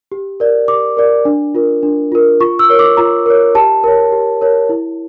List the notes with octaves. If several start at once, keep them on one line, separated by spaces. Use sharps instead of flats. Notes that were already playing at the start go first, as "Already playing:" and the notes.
G4
A#4 D5
G4 D6
A#4 D5
D4
F4 A#4
D4
F4 A#4
F4 C#6
E6
A#4 C#5
D6
F4 A#5
A#4 C#5
G4 A5
A#4 C#5
G4
A#4 C#5
E4